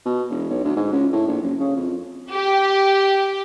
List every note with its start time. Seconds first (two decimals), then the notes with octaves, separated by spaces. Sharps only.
0.05 B2
0.30 E1
0.49 B1
0.64 D2
0.76 G#2
0.92 C#2
1.12 A2
1.28 A#1
1.42 F#1
1.59 C#3
1.76 F2
2.32 G4